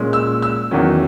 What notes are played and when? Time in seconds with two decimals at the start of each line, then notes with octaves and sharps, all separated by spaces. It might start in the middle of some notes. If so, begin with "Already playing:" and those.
Already playing: A#2 G#3 C#4
0.13 E6
0.42 E6
0.71 E2 D#3 F#3 C#4